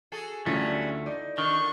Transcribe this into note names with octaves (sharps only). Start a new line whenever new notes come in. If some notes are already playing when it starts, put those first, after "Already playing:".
F#4 G#4 A4
D2 F#3 G3 A3 C#4 E4 F4 A4
D#4 D5
D#3 D4 C#6